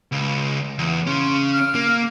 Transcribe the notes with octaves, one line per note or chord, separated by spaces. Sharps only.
C#2
E2
C#3 C#4 C6
F6
A#3